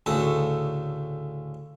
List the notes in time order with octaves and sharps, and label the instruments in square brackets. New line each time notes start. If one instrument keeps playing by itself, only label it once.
[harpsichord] D2 A2 C#3 A4 D#6